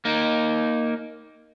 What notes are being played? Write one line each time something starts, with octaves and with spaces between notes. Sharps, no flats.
A#3 D#4